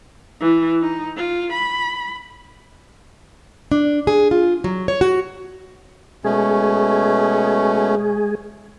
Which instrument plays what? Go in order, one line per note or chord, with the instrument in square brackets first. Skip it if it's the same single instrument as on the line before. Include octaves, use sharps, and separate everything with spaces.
[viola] E3
D#4
F4
B5
[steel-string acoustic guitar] D4
G#4
F4
F#3
C#5
F#4
[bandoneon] B2 A3 C#4 [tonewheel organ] G#3 G#4